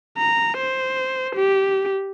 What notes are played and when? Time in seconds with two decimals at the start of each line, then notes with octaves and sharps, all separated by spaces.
0.18 A#5
0.57 C5
1.36 G4